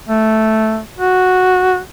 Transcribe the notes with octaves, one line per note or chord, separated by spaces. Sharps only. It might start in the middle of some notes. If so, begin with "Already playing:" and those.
A3
F#4